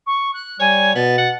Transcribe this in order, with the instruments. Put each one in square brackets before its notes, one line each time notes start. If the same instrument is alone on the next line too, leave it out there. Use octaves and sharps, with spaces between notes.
[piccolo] C#6
F#6
[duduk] G3 [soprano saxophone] C#5 [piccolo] G#5
[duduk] B2 [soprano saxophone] B3 [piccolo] A6
[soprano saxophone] F#5